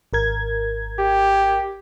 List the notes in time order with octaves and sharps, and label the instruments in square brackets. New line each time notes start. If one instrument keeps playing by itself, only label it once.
[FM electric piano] G#1 A#4 G#6
[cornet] G4